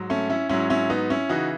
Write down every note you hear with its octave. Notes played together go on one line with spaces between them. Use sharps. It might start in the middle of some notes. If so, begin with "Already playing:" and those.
Already playing: G#2 F#3
A3 C#4
C#4 E4
G#2 F#3 C#4 E4
C#4 E4
B3 D#4
C#4 E4
C#3 E3 D#4 F#4